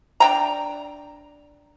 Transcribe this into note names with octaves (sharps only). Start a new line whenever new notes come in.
D4 G5 A#5